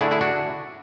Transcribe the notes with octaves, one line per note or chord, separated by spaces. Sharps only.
D3 A3 D4 E4 G#4
E4 G#4
D4 F#4